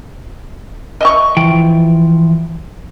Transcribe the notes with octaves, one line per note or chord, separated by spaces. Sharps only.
D#5 E5 C#6
E3 F3 G5